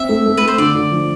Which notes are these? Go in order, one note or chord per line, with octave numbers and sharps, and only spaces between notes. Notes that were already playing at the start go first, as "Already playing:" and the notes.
Already playing: C4 E5
A3
A3
A3 B4
C5
D3 D5
D3
F3